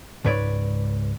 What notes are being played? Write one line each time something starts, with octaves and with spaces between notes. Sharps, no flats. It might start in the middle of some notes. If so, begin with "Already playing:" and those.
C#2 G#2 B4 C#5 D5